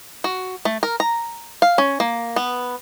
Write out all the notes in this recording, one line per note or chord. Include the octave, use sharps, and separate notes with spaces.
F#4
A3
A#4
A#5
F5
C#4
A#3
B3